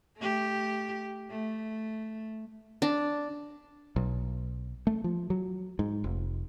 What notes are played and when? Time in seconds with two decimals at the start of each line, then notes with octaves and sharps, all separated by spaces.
0.17 A3 G4
1.30 A3
2.82 D4
3.96 B1
4.87 A3
5.04 F3
5.30 F#3
5.79 G#2
6.04 F1